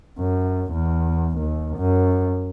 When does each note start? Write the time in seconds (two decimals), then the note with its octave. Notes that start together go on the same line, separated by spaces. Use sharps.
0.19 F#2
0.73 E2
1.38 D#2
1.77 F#2